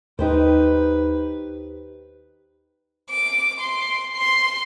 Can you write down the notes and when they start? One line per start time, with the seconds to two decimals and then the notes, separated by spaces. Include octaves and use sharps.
0.19 D#2 D#4 G4 B4 C5
3.10 D6
3.60 C6
4.16 C6